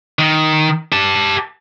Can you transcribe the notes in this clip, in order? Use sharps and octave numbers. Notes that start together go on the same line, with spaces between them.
D#3
G4 A5